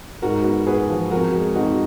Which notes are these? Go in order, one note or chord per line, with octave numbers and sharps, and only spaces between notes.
G#2 F#4 A#4
B3
F#4 G#4 B4
F3
F2 F#4 A#4
G#3
F2 D#4 F#4